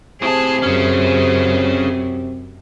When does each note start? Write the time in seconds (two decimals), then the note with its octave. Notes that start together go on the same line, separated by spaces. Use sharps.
0.22 A2 C3 G#4 C5 A5
0.62 F#2 C#4 G#4